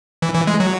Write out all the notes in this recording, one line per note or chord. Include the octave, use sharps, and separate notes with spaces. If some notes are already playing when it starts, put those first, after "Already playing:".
E3
E3
G#3
F#3